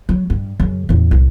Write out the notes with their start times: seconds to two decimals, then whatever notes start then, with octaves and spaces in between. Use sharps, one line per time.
0.09 F#3
0.30 G2
0.60 F#2 C#3
0.89 E2 A2
1.11 C2